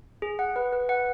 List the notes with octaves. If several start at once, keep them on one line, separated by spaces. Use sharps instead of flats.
G#4
F#5
B4
B4
F#5